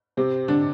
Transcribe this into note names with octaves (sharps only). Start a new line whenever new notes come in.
C3 C4
D3 D4